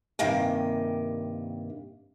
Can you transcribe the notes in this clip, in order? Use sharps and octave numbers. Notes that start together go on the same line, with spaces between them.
G2 C3 D#3 A#3 G5 G#5